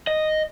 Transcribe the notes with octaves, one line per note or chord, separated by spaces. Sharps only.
D#5